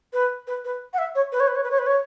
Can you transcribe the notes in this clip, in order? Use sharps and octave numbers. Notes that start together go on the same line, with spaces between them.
B4
B4
B4
F#5
E5
C#5
B4
C#5
B4
C#5
B4
C#5
B4
C#5